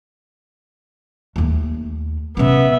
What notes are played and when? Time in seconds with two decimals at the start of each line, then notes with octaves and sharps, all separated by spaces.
1.36 D#2 A3
2.37 C3 B3 C#4 E5